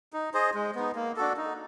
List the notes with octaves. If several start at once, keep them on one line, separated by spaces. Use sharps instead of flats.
D#4
G#4 C5 D#5
G#3
B3 D#4
A#3
D4 F#4 A4
D#4